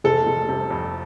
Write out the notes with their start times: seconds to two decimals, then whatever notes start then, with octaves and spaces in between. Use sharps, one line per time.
0.04 F1 A4
0.27 F1
0.49 C3
0.71 F2